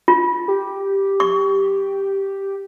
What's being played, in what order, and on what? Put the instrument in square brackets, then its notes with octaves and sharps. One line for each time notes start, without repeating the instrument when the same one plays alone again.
[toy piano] F4
[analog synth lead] G4
[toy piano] C#6